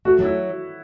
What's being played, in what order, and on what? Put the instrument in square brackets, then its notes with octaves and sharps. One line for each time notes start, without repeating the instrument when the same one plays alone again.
[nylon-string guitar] A3 [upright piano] F#4
[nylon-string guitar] F#3 [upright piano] E4